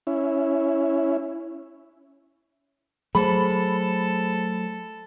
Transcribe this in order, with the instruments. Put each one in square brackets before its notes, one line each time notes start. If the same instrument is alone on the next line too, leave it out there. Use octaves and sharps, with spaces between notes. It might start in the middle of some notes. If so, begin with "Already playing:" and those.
[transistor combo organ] C#4 E4
[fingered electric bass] F#3 A3 [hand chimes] G#4 C5 [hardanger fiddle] A4 [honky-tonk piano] B5